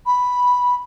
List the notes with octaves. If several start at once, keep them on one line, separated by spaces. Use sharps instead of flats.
B5